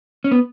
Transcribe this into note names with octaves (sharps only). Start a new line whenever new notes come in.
C#4
B3